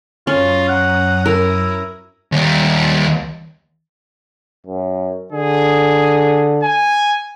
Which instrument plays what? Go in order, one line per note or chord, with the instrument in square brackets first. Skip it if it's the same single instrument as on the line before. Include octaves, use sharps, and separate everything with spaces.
[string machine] F#2 A#5 D#6 [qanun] C#4 [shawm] F4
[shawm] F#5
[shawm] E4 [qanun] A#4
[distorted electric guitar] D#2 G3
[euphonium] F#2
[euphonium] D3 [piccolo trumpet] G#4
[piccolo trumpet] G#5